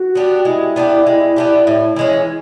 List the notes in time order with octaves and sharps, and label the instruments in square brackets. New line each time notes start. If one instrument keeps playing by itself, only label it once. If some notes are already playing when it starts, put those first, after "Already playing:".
Already playing: [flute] F#4
[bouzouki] B3 D4 G4
[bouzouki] G#3 [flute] E4
[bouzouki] B3 D4 G4
G#3
B3 D4 G4
A2
E3 G#3 C#4
[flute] E4